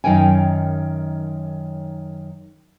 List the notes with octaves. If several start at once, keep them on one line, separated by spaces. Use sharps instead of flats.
F#2 D#3 D#4 A#4 G5 G#5